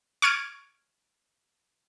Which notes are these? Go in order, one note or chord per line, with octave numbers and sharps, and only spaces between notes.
C#6 F6 G#6 D7